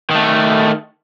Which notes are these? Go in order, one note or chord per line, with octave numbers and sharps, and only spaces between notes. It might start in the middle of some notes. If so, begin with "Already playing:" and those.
D#3 A3